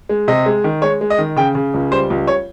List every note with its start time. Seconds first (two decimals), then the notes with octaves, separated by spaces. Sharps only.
0.09 G#3
0.28 C3 D#5
0.46 G#3
0.64 D#3
0.82 G#3 C#5
1.01 G#3
1.10 D#5
1.18 D#3
1.36 C#3 G5
1.55 C#3
1.74 C#2
1.91 G3 C5
2.10 C#2
2.27 C#5